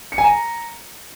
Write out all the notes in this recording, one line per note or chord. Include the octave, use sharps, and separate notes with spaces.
C#7
G#5
A#5